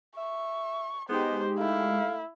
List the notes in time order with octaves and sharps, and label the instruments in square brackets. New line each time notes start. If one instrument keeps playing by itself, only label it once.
[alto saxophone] E5 [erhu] C#6
[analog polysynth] G#3 D#4 G4 [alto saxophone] B3 [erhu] C5
[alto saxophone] A3 [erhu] E4 [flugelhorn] F5